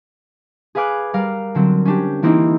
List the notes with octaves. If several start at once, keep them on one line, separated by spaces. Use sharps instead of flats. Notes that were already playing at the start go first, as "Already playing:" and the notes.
G#4 B4 F5 G#5 D6 F#6
G3 A#4 D5 F5
D3 F#3 C4
C#4 D4 G4
E3 A#3 C4 D#4 E4